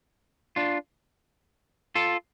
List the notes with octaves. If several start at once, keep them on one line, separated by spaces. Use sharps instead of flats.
D4 F4
F4 A4